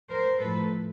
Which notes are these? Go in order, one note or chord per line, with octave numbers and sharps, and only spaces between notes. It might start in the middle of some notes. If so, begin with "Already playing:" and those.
A#4 C5
A2 F3 A3 A4 B4